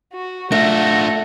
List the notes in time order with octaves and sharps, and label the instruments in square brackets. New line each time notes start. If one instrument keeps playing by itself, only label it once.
[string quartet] F#4
[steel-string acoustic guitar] A3 [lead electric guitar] D4 F4 [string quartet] F#5 [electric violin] A#6